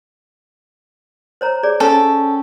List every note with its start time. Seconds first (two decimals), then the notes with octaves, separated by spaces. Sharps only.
1.41 C5 C#5 A#5
1.63 G#4 C#5 D5
1.80 C#4 A4 G5